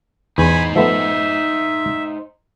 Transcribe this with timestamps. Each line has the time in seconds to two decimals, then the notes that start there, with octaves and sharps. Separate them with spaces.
0.38 E2 D#4 C5 G#5 B5
0.76 F3 A3 B3 E5